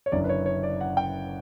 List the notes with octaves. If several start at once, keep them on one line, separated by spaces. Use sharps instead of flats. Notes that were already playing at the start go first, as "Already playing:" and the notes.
C#5
F#1 F#2 D3 F#3 D5
B4
C#5
C#5
D5
F#5
G5